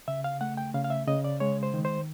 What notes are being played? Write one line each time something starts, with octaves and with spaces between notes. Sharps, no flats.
C#3 E5
F5
A3 F#5
G5
C#3 F5
F5
E5
C#3 D#5
D5
G#3 C#5
C5
D#3
C5